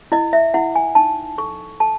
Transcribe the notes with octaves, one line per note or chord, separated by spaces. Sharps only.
E4 D#5
E5
E4 F#5
G#5
D#4 A5
A4 C#6
A4 A5